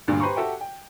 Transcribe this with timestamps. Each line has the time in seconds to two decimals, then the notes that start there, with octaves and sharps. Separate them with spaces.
0.08 D2 G2 A#2 D3
0.20 G4 B4 C5 A#5 C6 C#6
0.36 F#4 G4 A4 E5 F#5 G5
0.61 G5